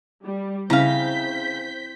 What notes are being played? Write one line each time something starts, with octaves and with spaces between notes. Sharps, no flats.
G3
C#3 C4 E4 C5 F5 A#5 G6 B6